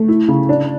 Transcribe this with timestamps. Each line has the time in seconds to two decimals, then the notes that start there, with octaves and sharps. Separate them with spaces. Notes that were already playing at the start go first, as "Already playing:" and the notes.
Already playing: A3
0.08 E4
0.28 C#3
0.49 D4